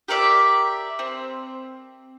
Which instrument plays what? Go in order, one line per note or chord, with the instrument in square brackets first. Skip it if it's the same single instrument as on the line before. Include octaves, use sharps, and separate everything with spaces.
[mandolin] G4 A#4 D5 E5
C4